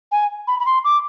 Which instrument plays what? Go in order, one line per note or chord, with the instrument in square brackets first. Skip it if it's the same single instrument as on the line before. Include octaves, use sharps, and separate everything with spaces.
[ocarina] G#5
B5
B5
C6
D6